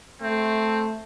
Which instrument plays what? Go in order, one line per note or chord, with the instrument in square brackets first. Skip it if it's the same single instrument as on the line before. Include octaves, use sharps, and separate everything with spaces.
[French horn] A3 [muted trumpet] C4